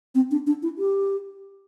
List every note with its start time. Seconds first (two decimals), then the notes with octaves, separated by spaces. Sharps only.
0.15 C4
0.31 D4
0.47 D4
0.62 E4
0.78 G4